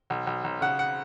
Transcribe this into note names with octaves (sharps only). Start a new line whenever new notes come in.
B1
B1
B1
C#3 F#5
F#5